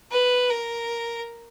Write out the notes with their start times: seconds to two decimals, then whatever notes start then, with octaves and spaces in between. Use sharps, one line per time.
0.11 B4
0.50 A#4